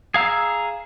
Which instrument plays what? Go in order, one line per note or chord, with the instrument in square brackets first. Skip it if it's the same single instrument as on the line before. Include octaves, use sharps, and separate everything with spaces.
[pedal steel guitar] G#4 F5 A#5 E6